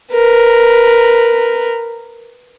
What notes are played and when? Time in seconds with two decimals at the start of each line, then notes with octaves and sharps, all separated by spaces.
0.13 A#4 B4